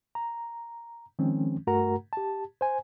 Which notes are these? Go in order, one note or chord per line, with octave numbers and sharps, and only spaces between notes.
A#5
D#3 F3 G#3 C4 C#4
G2 A3 F#4 A#4 F#5 A#5
G4 A5
C5 G#5